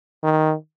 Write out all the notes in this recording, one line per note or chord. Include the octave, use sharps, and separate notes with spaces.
D#3